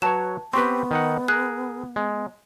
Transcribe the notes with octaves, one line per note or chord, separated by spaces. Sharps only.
F#3 B4 C#5 A5 E7
B3 C4 G4 B4 C6 C#6
D#3 D#4 F#5
G#4 A#4 F#6
G#3